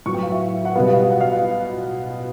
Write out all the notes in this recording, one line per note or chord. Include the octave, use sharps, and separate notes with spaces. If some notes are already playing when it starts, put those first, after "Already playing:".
A2 F#3 B3 C#6
G5
F5
E5
F#5
B2 G3 B3 F5
F5
F#5
F5